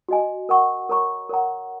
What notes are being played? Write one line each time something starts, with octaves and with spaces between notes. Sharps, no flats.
F#4 D#5 G#5
A#4 F#5 C#6
A#4 C#5 A#5 C#6
A#4 C#5 F#5 A#5